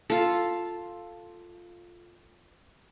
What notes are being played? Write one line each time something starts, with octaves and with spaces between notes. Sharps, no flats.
F4 A4